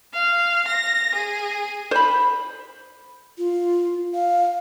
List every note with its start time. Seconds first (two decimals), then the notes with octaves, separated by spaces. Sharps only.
0.12 F5
0.65 A#6
1.13 G#4
1.91 C5 B5
3.38 F4
4.14 F5